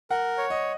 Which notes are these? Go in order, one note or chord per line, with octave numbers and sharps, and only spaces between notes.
A#4 F#5
C#5
D#5